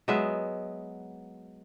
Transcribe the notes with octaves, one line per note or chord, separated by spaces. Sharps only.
F#3 G#3 B3 E5